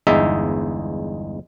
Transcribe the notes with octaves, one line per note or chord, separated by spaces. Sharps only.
G1 E2 G#3 D#4 E5